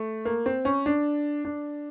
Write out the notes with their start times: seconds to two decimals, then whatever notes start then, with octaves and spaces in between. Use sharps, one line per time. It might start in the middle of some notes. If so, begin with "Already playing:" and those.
Already playing: A3
0.25 A#3
0.46 C4
0.65 C#4
0.86 D4
1.45 D4